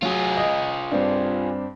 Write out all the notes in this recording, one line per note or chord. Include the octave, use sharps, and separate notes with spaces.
F#3 F4 G#4
D#5
G2 C4 D4